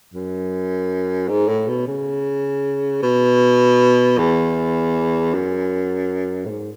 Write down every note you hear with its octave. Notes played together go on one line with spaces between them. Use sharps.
F#2
G#2
A2
B2
C#3
B2
E2
F#2
A2
G#2